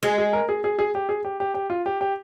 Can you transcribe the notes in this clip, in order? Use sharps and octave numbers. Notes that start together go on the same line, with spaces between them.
G#3 G#4
G#4
A#4
G#4
G#4
G#4
G4
G#4
G4
G4
G4
F4
G4
G4